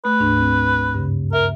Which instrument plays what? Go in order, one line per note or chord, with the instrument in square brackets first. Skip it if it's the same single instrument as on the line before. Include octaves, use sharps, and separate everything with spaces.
[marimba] A3 [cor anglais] B4
[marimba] D2 G#2 D4
C4
G2 C#3
[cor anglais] A#4 [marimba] E5